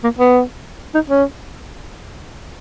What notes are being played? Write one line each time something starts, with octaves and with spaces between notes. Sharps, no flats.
A#3
B3
D#4
C#4